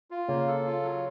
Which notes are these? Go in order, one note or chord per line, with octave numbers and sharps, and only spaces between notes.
F4
C#3 A#3
A4
F4
F#3